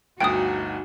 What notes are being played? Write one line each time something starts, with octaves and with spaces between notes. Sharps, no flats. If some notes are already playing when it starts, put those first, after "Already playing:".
G1 D2 D#4 F#4 G5 D#6